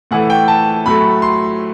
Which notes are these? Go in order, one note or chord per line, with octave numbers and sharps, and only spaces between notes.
A2 E3 A3 F#5
G5
A5
A2 F#3 A3 B5
C6